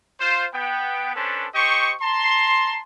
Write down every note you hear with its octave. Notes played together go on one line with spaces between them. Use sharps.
F4 C5
B3 G5
C#4 D4 A4 B4 C5
G4 C5 D#5 C#6
A5 A#5 C6